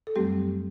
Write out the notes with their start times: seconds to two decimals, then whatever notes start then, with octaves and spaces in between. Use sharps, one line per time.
0.07 A4
0.16 F#2 F#3 G3 A3 C4 G4